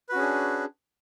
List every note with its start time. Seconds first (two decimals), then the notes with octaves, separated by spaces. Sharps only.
0.09 B4
0.12 F#4
0.15 C#4
0.18 G#4
0.22 D4